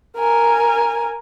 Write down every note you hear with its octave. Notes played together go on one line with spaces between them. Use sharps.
A#4 G#5